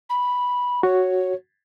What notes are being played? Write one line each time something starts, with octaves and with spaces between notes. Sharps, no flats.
B5
F#4 C#5